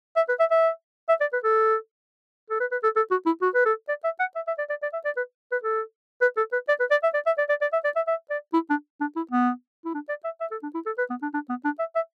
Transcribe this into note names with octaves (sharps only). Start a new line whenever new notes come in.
E5
B4
E5
E5
E5
D5
B4
A4
A4
B4
B4
A4
A4
F#4
E4
F#4
B4
A4
D5
E5
F#5
E5
E5
D5
D5
D5
E5
D5
B4
B4
A4
B4
A4
B4
D5
B4
D5
E5
D5
E5
D5
D5
D5
E5
D5
E5
E5
D5
E4
D4
D4
E4
B3
E4
D4
D5
E5
E5
A4
D4
E4
A4
B4
B3
D4
D4
B3
D4
E5
E5